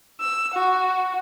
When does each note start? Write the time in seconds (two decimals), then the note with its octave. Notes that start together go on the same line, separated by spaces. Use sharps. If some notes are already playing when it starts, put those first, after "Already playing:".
0.21 E6
0.54 F#4